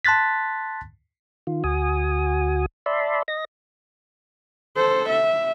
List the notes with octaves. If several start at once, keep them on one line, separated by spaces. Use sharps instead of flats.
A5 C6 F#6 A6 B6
D#3 F4
D2 F#4 G#5 D#6
D5 E5 A5 B5 C6
D#5 A#6
A4 C5
E5